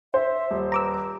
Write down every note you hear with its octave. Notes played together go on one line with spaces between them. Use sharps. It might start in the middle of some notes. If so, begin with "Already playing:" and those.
C5 E5
D#1
B4 A#5 D6 E6